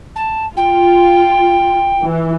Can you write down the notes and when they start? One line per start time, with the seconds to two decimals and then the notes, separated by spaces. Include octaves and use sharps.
0.16 A5
0.57 F4 G5
2.02 E3